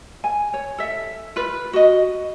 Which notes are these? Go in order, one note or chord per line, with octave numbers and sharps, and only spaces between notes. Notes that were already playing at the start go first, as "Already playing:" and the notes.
G#5
C#5
A4 E5
F4 B4
F#4 D#5